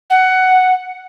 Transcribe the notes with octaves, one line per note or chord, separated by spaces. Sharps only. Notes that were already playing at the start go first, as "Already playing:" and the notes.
F#5